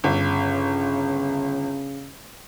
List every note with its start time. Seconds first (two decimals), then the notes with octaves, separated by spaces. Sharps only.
0.04 G1 C#3